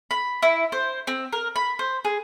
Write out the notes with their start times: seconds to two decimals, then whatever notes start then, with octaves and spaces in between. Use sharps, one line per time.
0.11 B5
0.42 E4
0.72 C5
1.07 C4
1.33 A#4
1.56 B5
1.79 C5
2.05 G#4